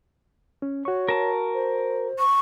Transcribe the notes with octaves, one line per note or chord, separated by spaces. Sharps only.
C#4
F#4 C#5 C#6
A#4 A5
C5
C#6